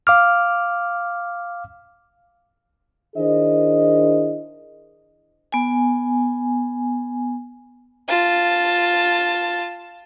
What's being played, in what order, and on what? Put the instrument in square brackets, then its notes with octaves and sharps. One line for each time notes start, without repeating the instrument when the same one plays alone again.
[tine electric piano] F5 D6 F6
[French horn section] D#3 D4 E4 G#4 C5 D#5
[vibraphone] B3 G#5
[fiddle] F4 A5